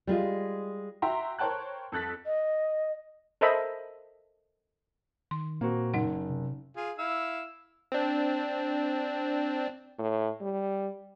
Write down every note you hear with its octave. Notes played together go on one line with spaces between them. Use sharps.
G3 G#3 F4
F#4 E5 G5 A#5 C6
A#4 C5 C#5 G5 A5 F#6
F2 A4 F#6 A6 B6
D#5
A4 A#4 C5 D#5 E5 B5
D#3 C6
A#2 A#3 C4 F#4
F#1 D#4 F#5
C3
F4 G#4
E4 F5 E6
C4 D4
A2
G3